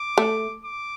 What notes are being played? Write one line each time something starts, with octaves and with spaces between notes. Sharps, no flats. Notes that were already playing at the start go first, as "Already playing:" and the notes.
Already playing: D6
A3
D6